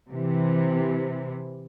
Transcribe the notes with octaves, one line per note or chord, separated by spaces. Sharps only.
C3 E3